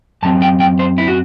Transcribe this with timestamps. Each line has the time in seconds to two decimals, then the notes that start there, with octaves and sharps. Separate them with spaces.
0.23 F#2 F#3 C4 A5
0.42 G5
0.60 G5
0.79 C5
0.98 E4
1.08 F#4